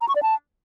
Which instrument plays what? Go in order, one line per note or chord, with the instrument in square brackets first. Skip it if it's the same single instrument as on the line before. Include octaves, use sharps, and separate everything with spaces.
[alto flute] A#5
C#6
D5
A5